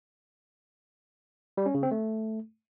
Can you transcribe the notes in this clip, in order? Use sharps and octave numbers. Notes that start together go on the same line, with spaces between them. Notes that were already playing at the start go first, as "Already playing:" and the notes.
G3
C#4
C#3
C4
A3